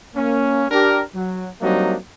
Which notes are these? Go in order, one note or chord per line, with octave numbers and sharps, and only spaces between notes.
A#3 C#4
D4 G4 A#4
F#3
F#3 G3 A#3 C4 D4 D#4